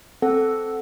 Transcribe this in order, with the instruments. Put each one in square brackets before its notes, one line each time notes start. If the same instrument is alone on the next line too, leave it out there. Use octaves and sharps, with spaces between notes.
[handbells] C4 A4 F#5